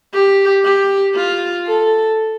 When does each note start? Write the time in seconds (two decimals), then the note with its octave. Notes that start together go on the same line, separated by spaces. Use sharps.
0.14 G4
0.64 G4
1.16 F4
1.68 A4